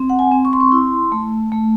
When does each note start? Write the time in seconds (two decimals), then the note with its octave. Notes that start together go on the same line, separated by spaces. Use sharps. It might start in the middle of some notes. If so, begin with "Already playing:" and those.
Already playing: C4
0.10 F#5
0.19 G#5
0.32 C4
0.45 C#6
0.53 C6
0.60 C#6
0.72 E4 C6
1.12 A3
1.52 A3